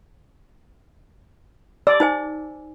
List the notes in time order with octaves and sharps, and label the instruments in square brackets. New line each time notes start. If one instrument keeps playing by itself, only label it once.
[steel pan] D5 [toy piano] E6
[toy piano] D#4 C5 G#5